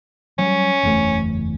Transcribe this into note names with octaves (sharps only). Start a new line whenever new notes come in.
F#3 G3 C#4
F#1 E2 A3